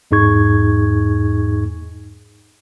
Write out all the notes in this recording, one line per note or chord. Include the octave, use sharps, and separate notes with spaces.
E2 G#2 D#4 G#4 C#6 G#6